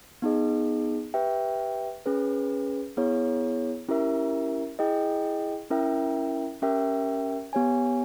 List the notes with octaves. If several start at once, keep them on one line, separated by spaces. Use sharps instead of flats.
B3 D#4 G#4 D#5
G4 B4 E5 G5
C#4 G#4 B4
B3 E4 G#4 C#5
C#4 E4 G4 A#4 E5
E4 G#4 D#5 G5
C#4 E4 A#4 E5 G5
C#4 G4 A#4 E5 G5
B3 G4 C#5 G#5